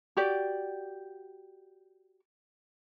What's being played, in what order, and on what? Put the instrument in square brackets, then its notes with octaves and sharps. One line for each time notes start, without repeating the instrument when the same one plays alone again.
[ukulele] F#4 G4 D5